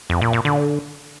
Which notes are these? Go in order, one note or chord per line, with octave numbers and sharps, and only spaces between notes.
F2
A#2
A#2
D3